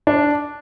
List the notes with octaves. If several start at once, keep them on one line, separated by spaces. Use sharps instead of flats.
D4